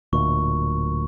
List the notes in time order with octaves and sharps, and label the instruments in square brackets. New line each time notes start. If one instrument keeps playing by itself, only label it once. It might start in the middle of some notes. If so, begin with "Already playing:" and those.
[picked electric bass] D1 D2 A#2 [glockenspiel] C#6